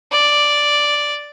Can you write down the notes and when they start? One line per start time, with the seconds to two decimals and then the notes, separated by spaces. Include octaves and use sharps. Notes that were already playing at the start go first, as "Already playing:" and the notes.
0.12 D5